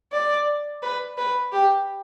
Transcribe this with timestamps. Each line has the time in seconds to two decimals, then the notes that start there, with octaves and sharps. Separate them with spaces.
0.12 D5
0.82 B4
1.17 B4
1.52 G4